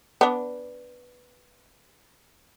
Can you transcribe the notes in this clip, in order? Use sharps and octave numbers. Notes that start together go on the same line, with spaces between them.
B3 D4